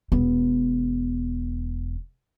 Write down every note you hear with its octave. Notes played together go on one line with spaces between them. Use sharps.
E1 B3